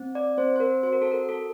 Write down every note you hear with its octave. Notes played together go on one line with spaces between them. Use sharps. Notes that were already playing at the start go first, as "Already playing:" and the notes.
Already playing: C4
D5
C4 C5
C5
A#4
F#4 C5
A#4
A4
A#4
A4